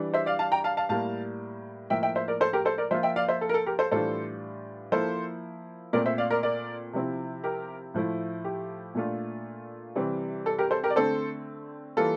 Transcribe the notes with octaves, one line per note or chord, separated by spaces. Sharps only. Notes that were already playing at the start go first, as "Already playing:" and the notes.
Already playing: E3 G3 D4
C5 E5
D5 F5
F5 A5
G5 A#5
F5 A5
F5 A5
A2 G3 A#3 F5 A5
A2 F3 A#3 E5 G5
E5 G5
C5 E5
A#4 D5
A4 C5
G4 A#4
A4 C5
A#4 D5
F3 A#3 F4 C5 E5
E5 G5
D5 F5
C5 E5
A4
A#4
A4
G4 A#4
A4 C5
A2 E3 G3 D4 F4 A4 C5
F3 A#3 E4 A4 C5
A#2 A3 C4 A#4 D5
C5 E5
D5 F5
A#4 D5
A#4 D5
C3 F3 C4 E4
G4 A#4
A2 F3 A3 E4
G4
A#2 A3 D4 F4
C3 E3 G3 C4
A4
G4 A#4
A4 C5
G4 A#4
D5
D3 A3 C4 A4 C5
E3 G3 A#3 F4 A4